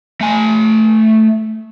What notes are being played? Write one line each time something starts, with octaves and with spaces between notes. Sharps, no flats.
A3 G#5